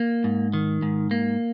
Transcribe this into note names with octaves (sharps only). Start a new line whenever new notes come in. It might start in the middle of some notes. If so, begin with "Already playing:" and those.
Already playing: A#3
G#2
D#3
G#2
A#3